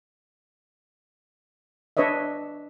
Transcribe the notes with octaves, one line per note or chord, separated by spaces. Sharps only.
D4 B4 C#5 D#5 E5